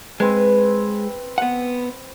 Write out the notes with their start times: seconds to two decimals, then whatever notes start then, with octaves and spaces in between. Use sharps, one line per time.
0.20 G#3 C4 B4
1.38 B3 F#5